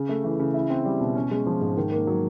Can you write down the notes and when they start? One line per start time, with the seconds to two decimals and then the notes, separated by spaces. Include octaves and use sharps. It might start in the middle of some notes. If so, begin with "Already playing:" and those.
Already playing: C#3
0.09 A3
0.24 E3
0.39 C#3
0.54 E4
0.70 C4
0.85 G3
1.01 B2
1.15 C#4
1.31 G#3
1.47 F3
1.61 G#2
1.77 D#3
1.92 A#3
2.07 F#3